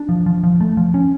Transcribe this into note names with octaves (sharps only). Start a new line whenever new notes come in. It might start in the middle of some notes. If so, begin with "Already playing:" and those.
Already playing: D4
F3
F3
F3
A3
F3
C#4